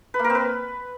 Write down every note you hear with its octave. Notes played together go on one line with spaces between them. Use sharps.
B4
A#3
A#4
C4
B4